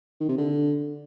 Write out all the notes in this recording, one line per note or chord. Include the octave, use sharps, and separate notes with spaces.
D#3
C3
D3